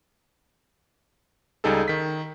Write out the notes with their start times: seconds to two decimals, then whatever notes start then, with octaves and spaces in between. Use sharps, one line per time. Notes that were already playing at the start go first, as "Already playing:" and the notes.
1.64 C#2 G3 D#4 G#4 A4
1.88 D#3 B6